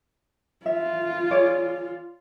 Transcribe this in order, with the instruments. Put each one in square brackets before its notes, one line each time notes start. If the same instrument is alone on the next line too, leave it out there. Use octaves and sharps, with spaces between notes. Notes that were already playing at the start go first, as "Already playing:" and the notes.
[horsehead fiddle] F4 [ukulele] E5
[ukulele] G#4 C#5 D5